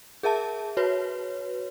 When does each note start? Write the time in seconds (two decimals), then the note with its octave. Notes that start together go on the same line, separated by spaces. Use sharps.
0.23 G#4 A#4 E5 A5
0.77 F#4 B4 C#5